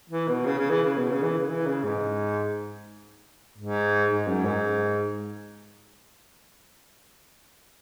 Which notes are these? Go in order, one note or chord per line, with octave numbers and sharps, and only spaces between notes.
E3
B2
C#3
C#3
E3
C#3
B2
C#3
E3
C#3
E3
C#3
G#2
G#2
G#2
F#2
G#2